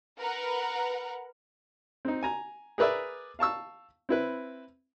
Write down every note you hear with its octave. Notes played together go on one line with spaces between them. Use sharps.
A#4 B4 F#5 A#5
C4 D#4
G#5 A#5
G#4 A#4 B4 D5 E5
F5 A5 C#6 E6
C4 E4 B4